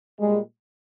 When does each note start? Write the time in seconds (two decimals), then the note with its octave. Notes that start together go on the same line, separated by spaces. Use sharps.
0.19 A#2 G3 G#3